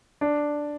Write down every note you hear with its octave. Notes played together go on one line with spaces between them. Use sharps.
D4